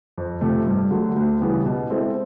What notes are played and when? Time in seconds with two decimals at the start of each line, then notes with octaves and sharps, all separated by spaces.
0.17 F2
0.41 C3 F3 A3
0.66 G2
0.91 D3 F#3 A3
1.16 D2
1.41 C#3 E3 G3 B3
1.66 B2
1.90 G#3 C4 E4 A4